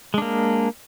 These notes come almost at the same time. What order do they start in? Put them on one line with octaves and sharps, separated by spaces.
G#3 D4 A#3